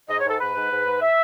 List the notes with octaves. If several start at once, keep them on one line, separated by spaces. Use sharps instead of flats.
G#2 D#5
G#2 C#5
A4
G#2 B4
G#2
G#2
G#2
E5